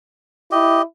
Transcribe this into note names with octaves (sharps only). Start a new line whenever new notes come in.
E4 G4 D#5